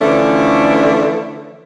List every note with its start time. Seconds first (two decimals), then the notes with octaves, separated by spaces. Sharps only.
0.01 D3 E3 F3 A3 C#4 D4